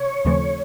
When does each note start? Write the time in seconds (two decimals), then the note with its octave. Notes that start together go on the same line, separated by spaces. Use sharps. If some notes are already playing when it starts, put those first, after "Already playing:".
Already playing: C3 C#5
0.25 D#2 C#3 F3 A3 C4